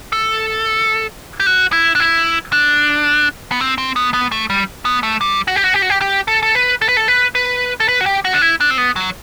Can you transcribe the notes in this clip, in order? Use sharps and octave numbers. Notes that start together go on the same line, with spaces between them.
A4
G4
F#4
E4
D4
E4
D4
B3
C4
C4
B3
B3
A3
G3
B3
A3
G3
F#4
G4
F#4
G4
F#4
G4
G4
A4
A4
B4
A4
B4
A4
B4
B4
A4
B4
F#4
G4
F#4
D4
E4
D4
C4
B3
F#3